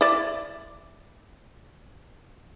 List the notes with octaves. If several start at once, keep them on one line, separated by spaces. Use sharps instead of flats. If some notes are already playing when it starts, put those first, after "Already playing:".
E4 D5